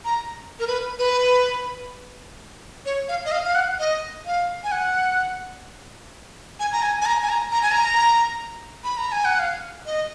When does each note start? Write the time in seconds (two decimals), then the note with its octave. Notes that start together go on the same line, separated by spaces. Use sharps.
0.05 A#5
0.60 A#4
0.67 B4
0.99 B4
2.85 C#5
3.09 F5
3.25 D#5
3.32 F5
3.45 F5
3.55 F#5
3.79 D#5
4.26 F5
4.64 G#5
4.72 F#5
6.60 G#5
6.72 A#5
6.83 G#5
7.01 G#5
7.06 A#5
7.23 G#5
7.29 A#5
7.52 A#5
7.62 G#5
7.72 A#5
8.84 B5
8.97 A#5
9.12 G#5
9.25 F#5
9.39 F5
9.86 D#5